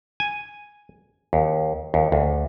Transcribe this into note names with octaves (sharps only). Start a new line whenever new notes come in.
G#5
D#2
D#2
D2